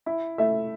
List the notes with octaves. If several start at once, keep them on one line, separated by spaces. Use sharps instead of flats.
E4
A3 E5